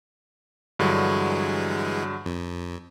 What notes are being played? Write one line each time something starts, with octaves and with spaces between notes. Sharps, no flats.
G2 D3 E3 F#3 G#3 G#4
F2